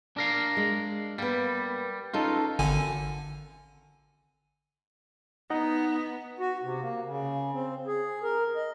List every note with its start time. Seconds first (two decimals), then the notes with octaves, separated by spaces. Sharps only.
0.17 D4 A#4 F5
0.57 G#3
1.18 G3 A#3 B3
2.14 C#4 D#4 F4 A4
2.59 G#1 D3 G#5
5.50 B3 D#4 D#5 F#5
6.40 F#4
6.63 C3
6.81 A#3
7.05 C#3
7.54 C4
7.87 G#4
8.23 A#4
8.56 D#5